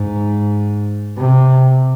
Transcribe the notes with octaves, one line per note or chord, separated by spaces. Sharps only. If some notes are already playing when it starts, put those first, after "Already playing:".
Already playing: G#2
C3